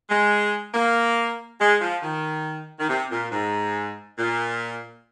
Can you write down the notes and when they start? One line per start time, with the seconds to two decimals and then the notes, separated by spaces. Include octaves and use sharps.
0.09 G#3
0.74 A#3
1.60 G#3
1.81 F3
2.02 D#3
2.79 D#3
2.88 C3
3.11 A#2
3.31 G#2
4.17 A#2